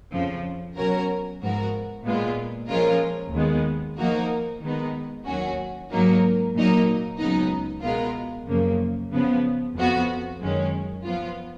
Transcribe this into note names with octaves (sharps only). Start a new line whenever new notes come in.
F2 C#3 F3
B2 F#3 C#4 F#4 A#4
G#2 F3 B3 F#4 A#4
A#2 G#3 B3 F4
F3 G#3 C#4 F4 A#4
D#2 D#3 G#3 B3
F3 A#3 D#4 F#4 A#4
D#3 G#3 B3 D#4
D#2 D#3 F#3 C#4 F#4
G#2 F#3 A#3 D#4
A#2 F#3 A#3 D#4
C#2 C#3 F#3 B3 D#4
B2 G#3 B3 F4 A#4
F#2 C#3 F3 A#3
C#3 F3 B3
F2 F3 B3 F#4
F#2 D#3 G#3 C#4
F3 B3 F4